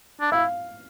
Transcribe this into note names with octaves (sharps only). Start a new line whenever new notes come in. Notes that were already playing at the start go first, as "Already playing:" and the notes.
D4
E4 F5